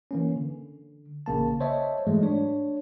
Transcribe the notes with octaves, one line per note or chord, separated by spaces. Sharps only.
E3 A#3 C#4
D3
A1 C#3 A#3 A5
C5 C#5 D#5 E5 A5
G#2 E3 F#3 G#3 A3
D4 C#5